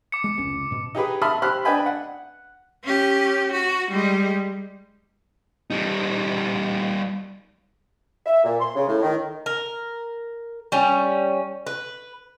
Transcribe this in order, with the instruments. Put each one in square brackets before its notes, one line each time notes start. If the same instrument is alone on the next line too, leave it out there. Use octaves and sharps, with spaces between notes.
[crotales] D6 C#7
[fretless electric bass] G#3
F1 C#2 C#4
G#2 B2
[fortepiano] D#4 G4 G#4 B4
E5 A5 B5 C6 D#6 F6
G4 C5 B5 C6 F6 F#6
D4 B4 D#5 G5 G#5 B5
F#5
[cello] C#4 G4
F#4
G3 G#3
[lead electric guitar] G3 D#4
[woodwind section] E5
A#2
C6
C#3
A2
D#3
[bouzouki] A#4
G3 C#4
B4